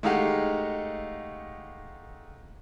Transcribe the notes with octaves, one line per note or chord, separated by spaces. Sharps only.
G#3 A3 D#4 G4 F5 F#5